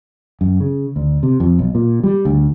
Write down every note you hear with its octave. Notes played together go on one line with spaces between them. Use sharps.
F#2
C#3
D2
C3
F2
B1
A#2
G3
D2